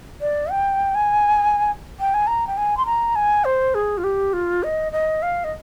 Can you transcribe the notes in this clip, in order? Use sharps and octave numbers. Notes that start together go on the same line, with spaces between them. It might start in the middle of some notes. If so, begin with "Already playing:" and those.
D5
G5
G#5
G5
G#5
A#5
G5
G#5
C6
A#5
G#5
C5
G#4
F4
G4
F4
D#5
D#5
F5
D#5